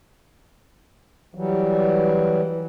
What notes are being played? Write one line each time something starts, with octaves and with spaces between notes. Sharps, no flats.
E3 F#3 G3